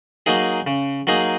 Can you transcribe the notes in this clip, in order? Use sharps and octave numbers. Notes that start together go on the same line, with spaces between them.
F#3 A#3 D#4 G#4
C#3
F#3 A#3 D#4 G#4